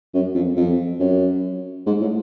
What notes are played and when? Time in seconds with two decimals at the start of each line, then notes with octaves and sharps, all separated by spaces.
0.14 F#2
0.34 F2
0.56 F2
0.99 F#2
1.86 G#2
2.01 A2